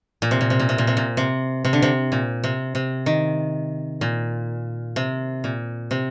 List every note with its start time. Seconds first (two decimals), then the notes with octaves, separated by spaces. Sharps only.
0.22 A#2
0.31 C3
0.41 A#2
0.50 C3
0.59 A#2
0.69 C3
0.78 A#2
0.87 C3
0.97 A#2
1.17 C3
1.65 C3
1.73 D3
1.82 C3
2.12 A#2
2.44 C3
2.75 C3
3.06 D#3
4.01 A#2
4.96 C3
5.44 A#2
5.91 C3